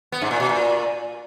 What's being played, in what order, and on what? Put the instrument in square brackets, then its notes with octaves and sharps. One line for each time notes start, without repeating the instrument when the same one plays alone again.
[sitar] B3
G#2
A#2
B2
A#2